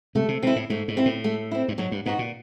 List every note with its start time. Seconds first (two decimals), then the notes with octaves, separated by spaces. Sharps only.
0.15 C3 A3
0.28 C3
0.43 B2 C4 E4
0.56 A2
0.70 G#2 A3
0.88 G#2
0.97 C4 E4
1.05 A2
1.24 A3
1.51 C4 E4
1.68 G2
1.78 G#2 F#3
1.91 G2
2.06 G#2 B3 D#4 F#4
2.19 A#2